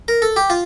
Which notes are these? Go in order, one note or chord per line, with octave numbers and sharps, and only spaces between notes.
A#4
A4
G4
F4